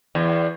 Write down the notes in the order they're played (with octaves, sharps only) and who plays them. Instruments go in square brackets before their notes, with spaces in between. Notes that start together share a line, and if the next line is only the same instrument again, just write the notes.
[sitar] E2